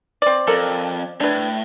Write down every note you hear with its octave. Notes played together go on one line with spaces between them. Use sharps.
C4 D5
F2 A4 A#4
A2 D4 B4